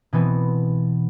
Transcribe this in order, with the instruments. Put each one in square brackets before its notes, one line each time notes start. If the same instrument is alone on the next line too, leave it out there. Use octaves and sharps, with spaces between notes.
[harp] B2 E3 B3 C4